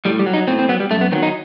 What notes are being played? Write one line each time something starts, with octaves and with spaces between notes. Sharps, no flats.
A2 G3
G3
F#3
D#4
A2 C4
C4
F#3 B3
G3
F#2 A3
B3
D#3 F#3 C4
D#4